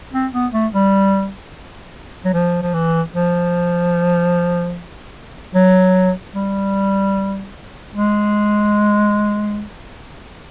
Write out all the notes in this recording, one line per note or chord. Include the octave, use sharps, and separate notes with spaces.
C4
B3
A3
G3
F#3
F3
F3
E3
F3
F#3
G3
G#3